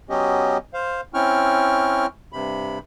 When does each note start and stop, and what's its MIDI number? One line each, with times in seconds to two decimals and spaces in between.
0.10 0.57 54
0.10 0.57 59
0.10 0.57 61
0.10 0.57 67
0.10 0.57 75
0.74 1.01 72
0.74 1.01 77
1.14 2.06 60
1.14 2.06 61
1.14 2.06 64
1.14 2.06 79
1.14 2.06 85
1.14 2.06 89
2.33 2.79 43
2.33 2.79 48
2.33 2.79 83